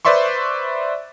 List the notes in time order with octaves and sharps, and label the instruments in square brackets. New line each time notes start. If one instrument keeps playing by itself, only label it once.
[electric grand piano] B4 C5 D5 E5 C6 C#6